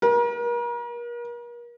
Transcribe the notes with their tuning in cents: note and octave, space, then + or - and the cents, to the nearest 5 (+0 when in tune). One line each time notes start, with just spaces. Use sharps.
A#4 +40